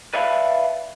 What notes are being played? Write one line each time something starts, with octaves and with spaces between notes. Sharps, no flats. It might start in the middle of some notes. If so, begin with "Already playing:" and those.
B4 D5 E5 F5 A5 B5